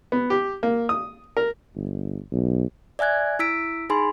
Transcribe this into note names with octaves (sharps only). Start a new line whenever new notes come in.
B3
G4
A#3
D#6
A#4
G1
B1
D5 E5 G#5 F#6 G#6
E4 E6 B6 D7
D#4 G#4 G#5 B5 C6